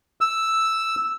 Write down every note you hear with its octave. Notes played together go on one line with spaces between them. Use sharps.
E6